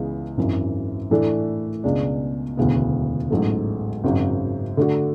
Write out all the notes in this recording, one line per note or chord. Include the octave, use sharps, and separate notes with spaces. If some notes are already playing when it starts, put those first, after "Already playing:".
Already playing: C#2 C#3 E3 G#3 B3
G#1 F#2 E3
A2 E3 A3 D4 A4
C#2 B2 G#3 D4
E1 D2 C#3 E3 B3
A1 G#2 F#3 A3
G#1 F#2 C#3 F#3
D3 A3 D4 F#4